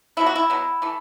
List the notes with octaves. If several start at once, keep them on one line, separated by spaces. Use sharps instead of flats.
B2 F#3 B3 E4
F#4
E4
B2 F#3 B3
E3 A3